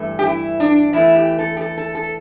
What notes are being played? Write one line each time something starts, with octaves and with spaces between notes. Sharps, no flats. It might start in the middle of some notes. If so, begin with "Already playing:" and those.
Already playing: G2 E3 A3
G4
E4
D4
E2 E3 A3 E4
G4
A4
G4
A4
A4
A4